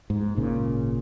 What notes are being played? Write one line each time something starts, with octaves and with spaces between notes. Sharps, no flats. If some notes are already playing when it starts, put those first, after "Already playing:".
G#2
G#1 A#2 C#3